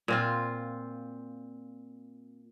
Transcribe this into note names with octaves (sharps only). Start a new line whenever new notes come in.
A#2 C4 F4